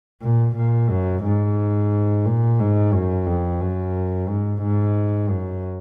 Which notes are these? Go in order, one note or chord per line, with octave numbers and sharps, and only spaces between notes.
A#2
A#2
F#2
G#2
A#2
G#2
F#2
F2
F#2
G#2
G#2
F#2